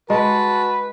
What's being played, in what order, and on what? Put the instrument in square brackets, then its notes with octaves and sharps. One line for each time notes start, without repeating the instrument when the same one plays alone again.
[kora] G#3 [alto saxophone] F#4 [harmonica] B4 [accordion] A5